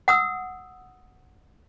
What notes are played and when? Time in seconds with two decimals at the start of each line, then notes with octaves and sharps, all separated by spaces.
0.08 F#5 D#6 E6